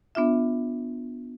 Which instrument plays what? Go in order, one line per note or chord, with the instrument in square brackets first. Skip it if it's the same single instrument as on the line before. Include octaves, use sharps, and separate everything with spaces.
[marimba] B3 D4 F4 E5